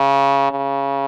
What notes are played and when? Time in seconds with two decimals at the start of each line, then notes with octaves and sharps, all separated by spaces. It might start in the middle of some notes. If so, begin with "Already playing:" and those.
Already playing: C#3
0.51 C#3